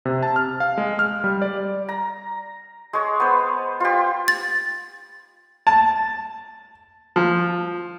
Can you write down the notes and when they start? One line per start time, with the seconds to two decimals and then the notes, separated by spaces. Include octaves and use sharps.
0.05 C3
0.23 A5
0.36 F6
0.60 F5
0.78 G#3
0.99 F6
1.24 G3
1.42 D5
1.89 A#5
2.93 G#3 C#5
3.20 B3 C5
3.80 F4 G4
4.28 A6
5.67 A5
7.16 F3